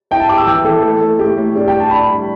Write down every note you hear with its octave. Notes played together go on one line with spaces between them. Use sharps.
E4 G5
A5
G4 D6
E6
E3 G5
E3 A4
A3
A3
A2 G4
A2
D4 G4
G5
G4
A5
D4 B5
G3